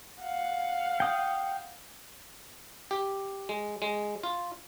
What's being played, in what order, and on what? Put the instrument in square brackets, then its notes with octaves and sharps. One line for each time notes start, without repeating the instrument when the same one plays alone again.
[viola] F5 F#5
[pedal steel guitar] G5 D#6
[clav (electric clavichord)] G4
G#3
G#3
F4